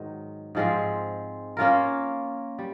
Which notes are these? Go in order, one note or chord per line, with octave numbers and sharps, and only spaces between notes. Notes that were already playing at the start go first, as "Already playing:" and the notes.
Already playing: G#2 D#3 F#3
G#2 F3 G#3 C4
A#3 C#4 F4 A#4
G3